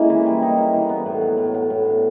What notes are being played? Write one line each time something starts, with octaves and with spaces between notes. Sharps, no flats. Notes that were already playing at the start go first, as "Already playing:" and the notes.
Already playing: G#3 A#3 C#4 E4
E3
G3
D#4
A#3
E3
B3
A2
F#3
A2
B3
A2
D4